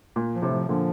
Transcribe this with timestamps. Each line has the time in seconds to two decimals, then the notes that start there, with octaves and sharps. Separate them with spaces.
0.16 A#2
0.34 F3
0.42 A2 C3
0.52 F3
0.69 A#2 D3 F3